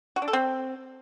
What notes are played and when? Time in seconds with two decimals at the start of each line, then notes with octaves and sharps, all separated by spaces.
0.16 F#4
0.22 D4
0.28 A4
0.33 C4